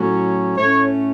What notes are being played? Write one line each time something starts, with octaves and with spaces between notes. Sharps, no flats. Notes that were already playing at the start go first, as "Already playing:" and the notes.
Already playing: A2 F#3 A3 C#4
A2 A3 C#4 C#5